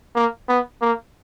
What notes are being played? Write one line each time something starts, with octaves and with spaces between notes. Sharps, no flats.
A#3
B3
A#3